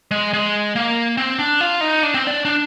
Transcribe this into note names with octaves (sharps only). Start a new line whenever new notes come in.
G#3
G#3
A#3
C4
D4
F4
D#4
D4
C4
D4
D4